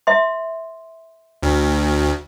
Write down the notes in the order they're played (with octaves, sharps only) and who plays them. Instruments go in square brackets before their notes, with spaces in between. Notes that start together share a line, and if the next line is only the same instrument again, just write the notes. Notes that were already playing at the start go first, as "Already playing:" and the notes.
[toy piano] E5 C6
[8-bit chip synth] D2